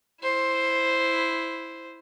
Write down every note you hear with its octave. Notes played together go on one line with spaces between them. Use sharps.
E4 C5